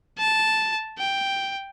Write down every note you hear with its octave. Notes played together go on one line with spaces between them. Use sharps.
A5
G5